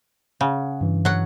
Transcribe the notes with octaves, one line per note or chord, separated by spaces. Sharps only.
C#3 F#5
G2 E3
F#3 F#5